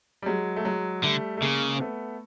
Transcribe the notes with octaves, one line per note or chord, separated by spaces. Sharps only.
G3
F#3 G#3
A3
F#3 G#3
D3 G3 A3
A3
C#3 G#3 A#3
C4
A3 B3